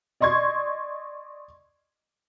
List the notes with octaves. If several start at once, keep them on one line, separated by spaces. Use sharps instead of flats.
D5 D#5 C6 C#6 G#6